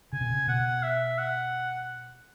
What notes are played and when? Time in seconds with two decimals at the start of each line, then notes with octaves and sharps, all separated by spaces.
0.13 C#3 G#5
0.21 B2
0.30 C#3
0.47 B2 F#5
0.83 E5
1.18 F#5